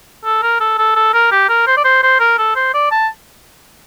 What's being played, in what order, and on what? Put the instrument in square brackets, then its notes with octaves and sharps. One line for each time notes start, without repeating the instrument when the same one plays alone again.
[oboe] A4
A#4
A4
A4
A4
A#4
G4
A#4
C5
D5
C5
C5
A#4
A4
C5
D5
A5